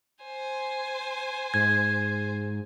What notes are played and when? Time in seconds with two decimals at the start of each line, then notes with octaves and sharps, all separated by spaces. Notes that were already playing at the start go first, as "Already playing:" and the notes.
0.24 C5 G#5
1.54 G#2 G#6